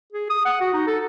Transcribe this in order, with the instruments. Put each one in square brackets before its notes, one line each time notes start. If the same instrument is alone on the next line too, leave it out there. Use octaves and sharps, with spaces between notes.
[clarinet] G#4
D#6
F#5
F#4
D#4
A4